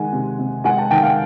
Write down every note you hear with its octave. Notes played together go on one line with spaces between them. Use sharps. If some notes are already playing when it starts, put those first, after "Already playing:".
Already playing: D#3 G#3 F#5 G#5
C3
C3
G#3 F#5 G#5
G5 A5
D#3 G5 A5
F5 G5